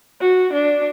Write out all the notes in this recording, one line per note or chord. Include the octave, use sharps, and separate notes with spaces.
F#4
D4